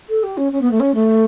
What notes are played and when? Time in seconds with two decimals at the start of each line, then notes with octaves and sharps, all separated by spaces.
0.09 A4
0.23 G4
0.37 C#4
0.52 C#4
0.61 B3
0.71 A3
0.80 C#4
0.94 A3